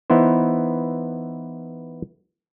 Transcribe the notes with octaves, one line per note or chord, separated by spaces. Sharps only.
E3 B3 D#4 E4 C5